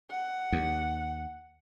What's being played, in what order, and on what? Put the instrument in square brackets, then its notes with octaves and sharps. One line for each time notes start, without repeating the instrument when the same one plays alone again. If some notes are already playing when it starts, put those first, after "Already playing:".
[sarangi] F#5
[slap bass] D#2